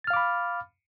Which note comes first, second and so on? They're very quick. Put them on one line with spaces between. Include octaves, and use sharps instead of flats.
A6 F6 F5 D6 B5